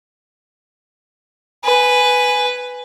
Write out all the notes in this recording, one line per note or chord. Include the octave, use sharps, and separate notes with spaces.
B4 G#5